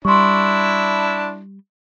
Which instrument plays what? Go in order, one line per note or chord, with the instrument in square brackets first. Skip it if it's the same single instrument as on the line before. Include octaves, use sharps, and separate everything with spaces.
[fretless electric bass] G3 [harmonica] D4 E4 [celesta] C6 C#6